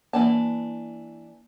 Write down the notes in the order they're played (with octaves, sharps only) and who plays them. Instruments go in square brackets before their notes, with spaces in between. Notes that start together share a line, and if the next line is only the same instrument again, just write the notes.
[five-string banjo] E3 D4 A5 [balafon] A#3